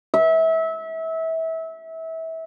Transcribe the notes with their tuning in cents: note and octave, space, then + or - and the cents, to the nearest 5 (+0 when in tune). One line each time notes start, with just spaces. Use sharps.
E5 -25